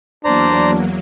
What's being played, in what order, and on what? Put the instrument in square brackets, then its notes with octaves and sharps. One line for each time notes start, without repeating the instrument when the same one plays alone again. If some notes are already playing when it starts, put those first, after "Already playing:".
[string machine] E2 F#3 A#3 [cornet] D4 [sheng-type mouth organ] C5 D5 A#5